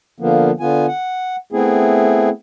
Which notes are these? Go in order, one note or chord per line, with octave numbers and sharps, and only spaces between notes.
D3 F3 A#3 B3
D3 B3 F4 G#5
F#5
A3 B3 C4 E4 G#4